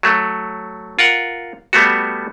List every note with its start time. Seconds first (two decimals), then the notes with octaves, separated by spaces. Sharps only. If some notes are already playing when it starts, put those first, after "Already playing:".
0.03 F#3 A3
0.99 F4 A#4 F#5
1.73 G3 A3 B3 F#4